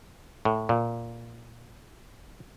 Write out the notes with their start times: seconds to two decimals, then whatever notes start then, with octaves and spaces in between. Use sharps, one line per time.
0.45 A2
0.69 A#2